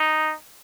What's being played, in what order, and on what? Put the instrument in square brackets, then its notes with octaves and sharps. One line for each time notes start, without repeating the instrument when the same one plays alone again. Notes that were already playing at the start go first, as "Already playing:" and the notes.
Already playing: [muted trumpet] D#4